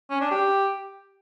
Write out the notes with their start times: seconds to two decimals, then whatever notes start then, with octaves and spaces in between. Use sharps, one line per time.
0.10 C#4
0.21 D4
0.31 G4